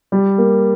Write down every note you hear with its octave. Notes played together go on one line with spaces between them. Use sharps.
G3
A#3